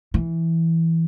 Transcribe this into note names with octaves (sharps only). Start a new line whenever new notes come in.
E3